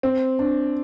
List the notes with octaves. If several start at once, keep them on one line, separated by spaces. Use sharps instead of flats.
C4
D4